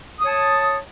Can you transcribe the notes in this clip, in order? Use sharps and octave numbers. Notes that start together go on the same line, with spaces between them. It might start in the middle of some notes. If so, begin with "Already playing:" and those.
C#5 A5 D#6